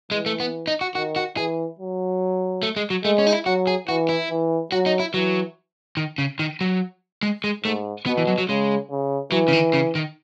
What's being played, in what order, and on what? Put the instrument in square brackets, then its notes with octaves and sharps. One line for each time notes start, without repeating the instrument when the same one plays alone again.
[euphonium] E3 [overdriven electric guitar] G#3
[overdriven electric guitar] A3
B3
D#4
F#4
[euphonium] D#3 [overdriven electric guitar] F#4
[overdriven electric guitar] F#4
[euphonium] E3 [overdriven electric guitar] G#4
[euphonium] F#3
[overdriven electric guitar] A3
G#3
F#3
[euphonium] G#3 [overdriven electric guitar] A3
[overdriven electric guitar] C#4
D#4
E4
[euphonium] F#3 [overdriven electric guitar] F#4
[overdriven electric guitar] G#4
[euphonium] E3 [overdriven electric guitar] F#4
[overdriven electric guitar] E4
[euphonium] E3
[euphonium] F#3 [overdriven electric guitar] F#4
[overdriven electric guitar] D#4
E4
[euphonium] E3 [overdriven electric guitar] F#3
[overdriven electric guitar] D#3
C#3
D#3
F#3
G#3
G#3
[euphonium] G#2 [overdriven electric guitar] A3
[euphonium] B2 [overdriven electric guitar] B3
[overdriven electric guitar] E3
F#3
F#3
[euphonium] C#3 [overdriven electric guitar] G#3
[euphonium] C#3
[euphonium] E3 [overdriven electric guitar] F#3
[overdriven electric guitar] C#3
D#3
C#3
D#3